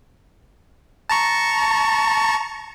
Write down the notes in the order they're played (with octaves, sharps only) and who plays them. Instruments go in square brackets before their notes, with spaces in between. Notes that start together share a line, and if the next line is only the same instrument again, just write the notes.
[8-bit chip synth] A5 A#5 C#6